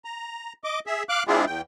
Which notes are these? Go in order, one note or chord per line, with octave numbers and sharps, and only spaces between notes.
A#5
D#5 D6
G#4 E5
F5 D6 F#6
G#3 C4 D4 E4 F4 G#4
E2 G5